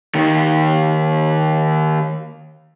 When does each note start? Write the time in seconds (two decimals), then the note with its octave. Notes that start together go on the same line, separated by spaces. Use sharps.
0.15 D#2 D#3